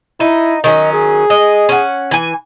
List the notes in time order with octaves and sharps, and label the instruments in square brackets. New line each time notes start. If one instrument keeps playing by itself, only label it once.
[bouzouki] D#4 [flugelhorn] E4
[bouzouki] D#3 F#3 C#4 [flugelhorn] D#5
[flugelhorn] G#4
[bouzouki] D#5
C#4 F#5
E3 G#5